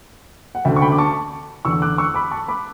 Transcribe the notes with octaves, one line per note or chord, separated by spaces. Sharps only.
F#5
D2 D3 E5 G5
C#6
G5 B5
D6
A5 C#6
E2 D3 C#6 E6
D6 F#6
C#6 E6
B5 D6
A5 C#6
B5 D6